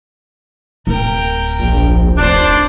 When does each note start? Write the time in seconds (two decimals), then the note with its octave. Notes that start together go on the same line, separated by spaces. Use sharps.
0.87 D1 A#4 G5
1.59 A#1
2.18 F1 D4 C5 D5